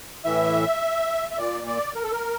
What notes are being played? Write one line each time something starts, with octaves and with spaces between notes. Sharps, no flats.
A2 E3 E5
E5
A#2 D5
D5
A#4
A4
A#4